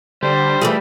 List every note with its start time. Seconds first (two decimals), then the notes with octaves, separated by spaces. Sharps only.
0.23 D3 G3 C5
0.61 E3 F3 A3 G#4